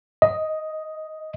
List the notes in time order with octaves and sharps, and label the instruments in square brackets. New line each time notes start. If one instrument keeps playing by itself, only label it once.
[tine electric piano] D#5